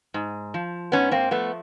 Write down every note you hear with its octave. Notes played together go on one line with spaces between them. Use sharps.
G#2
F3
G#2 B3 C#4
A#3 C4
F3 A3 B3